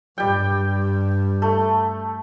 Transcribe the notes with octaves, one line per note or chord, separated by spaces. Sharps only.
G2 G3 G5
A3